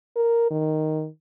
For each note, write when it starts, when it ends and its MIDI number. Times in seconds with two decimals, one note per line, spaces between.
0.16 0.47 70
0.51 1.08 51